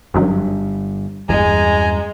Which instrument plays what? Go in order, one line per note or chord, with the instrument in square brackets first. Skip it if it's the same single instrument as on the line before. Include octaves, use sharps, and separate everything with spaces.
[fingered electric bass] G1 G3 D4 [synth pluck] F#2 D#3 F#3
[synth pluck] G1 [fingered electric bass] E2 G2 E3 [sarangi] G#3 [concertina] G#5 A#5